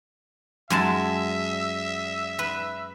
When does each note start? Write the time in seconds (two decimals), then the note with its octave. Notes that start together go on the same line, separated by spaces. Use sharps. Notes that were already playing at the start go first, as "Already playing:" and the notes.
0.70 F#2 G#3 E5 A5
2.39 B4